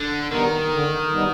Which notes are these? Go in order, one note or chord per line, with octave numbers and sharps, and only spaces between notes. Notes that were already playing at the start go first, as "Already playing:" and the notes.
Already playing: D3
D#3 G3 B3 D#4
D3
G3 B3 D#4